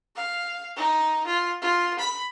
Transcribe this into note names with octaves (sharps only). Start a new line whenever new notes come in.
F5
D#4
F4
F4
B5